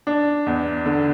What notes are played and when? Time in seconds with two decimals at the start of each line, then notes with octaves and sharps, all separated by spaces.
0.07 D4
0.47 E2
0.86 D3